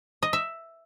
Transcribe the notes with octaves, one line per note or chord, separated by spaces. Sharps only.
D#5
E5